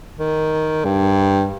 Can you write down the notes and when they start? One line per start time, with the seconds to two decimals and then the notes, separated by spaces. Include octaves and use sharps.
0.19 D#3
0.85 G2